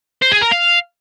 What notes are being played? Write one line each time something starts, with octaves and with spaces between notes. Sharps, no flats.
C5
G#4
A#4
F5